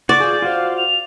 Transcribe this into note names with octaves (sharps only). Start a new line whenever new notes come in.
F#4 D5 C#6
F4 G#4 G6
F4 F#4 C5 F5
F7